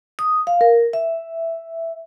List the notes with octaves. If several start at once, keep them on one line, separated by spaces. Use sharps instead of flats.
D#6
F5
A#4
E5